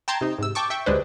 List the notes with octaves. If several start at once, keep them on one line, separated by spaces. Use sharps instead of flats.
G5 A5 A#5 C6 G#6
C3 D#4
G#2 C3 E6
G5 A5 C#6 D6
E5 G5 C#6
D2 G3 G#3 D4 B4 C5